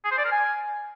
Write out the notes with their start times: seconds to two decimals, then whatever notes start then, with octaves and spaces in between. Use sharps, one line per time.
0.05 G#4
0.11 C5
0.18 D5
0.25 A#4
0.32 G#5